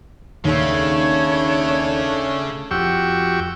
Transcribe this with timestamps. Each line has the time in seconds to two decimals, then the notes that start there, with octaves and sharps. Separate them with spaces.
0.45 D#2 C#3 A3 D4 C#5
2.71 F2 F#4 G4 G5 C#6 E6